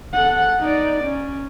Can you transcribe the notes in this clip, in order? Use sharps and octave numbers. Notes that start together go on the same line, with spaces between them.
A4 F#5
D#4 D5
C#4